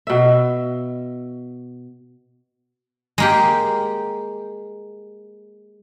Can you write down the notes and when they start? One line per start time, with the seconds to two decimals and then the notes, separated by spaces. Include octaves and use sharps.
0.07 B2 E5
3.18 G#3 A#3 G4